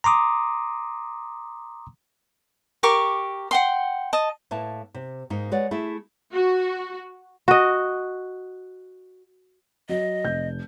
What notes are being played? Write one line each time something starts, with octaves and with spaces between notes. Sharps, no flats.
A#5 C6 D6 D#6
G4 A#4 C#6 D6
F#5 G5 C6
D#5 A5
A2 A#3 B4 E5 A5
C3
G#2 A#3 D#4
G#3 B4 C#5 D5 F#5
A3 E4 G#4
F#4
F#4 D#5
F#3 D#5
F1 G6